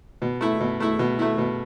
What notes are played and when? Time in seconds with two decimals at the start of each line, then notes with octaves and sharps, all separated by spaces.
0.22 B2
0.41 A3 E4
0.60 B2
0.80 A3 E4
0.99 B2
1.19 A3 E4
1.38 B2